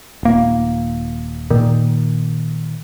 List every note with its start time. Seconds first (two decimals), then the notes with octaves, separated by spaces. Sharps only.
0.23 D#1 A#3
1.50 A#2 D#3